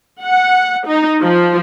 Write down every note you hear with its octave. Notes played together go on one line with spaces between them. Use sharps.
F#5
D#4
F3